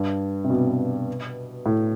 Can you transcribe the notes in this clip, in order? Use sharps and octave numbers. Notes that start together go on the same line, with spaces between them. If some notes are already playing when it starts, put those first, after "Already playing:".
Already playing: G2
C3
B2
A2